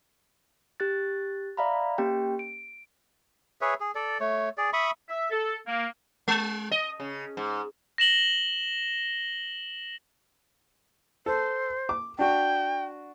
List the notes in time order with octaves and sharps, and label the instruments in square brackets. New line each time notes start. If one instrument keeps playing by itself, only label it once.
[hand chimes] G4 F#6 A6
D5 E5 F5 A#5 B5
A#3 C#4 G4 G5
D7
[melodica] G#4 B4 C#5 E5
G#4
A4 D5
A3 C#5
G#4 D5
E5 B5 C#6 D#6
[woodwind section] E5
A4
A#3
[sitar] G#3
D#5
C#3
G#2
[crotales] A#6 E7 F#7 G7
[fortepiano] A4 [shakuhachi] C5
[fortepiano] D6
[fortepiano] D4 F#4 [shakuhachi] G5